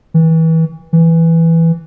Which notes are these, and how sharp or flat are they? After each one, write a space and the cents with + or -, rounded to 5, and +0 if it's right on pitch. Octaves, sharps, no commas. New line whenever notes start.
E3 -30
E3 +0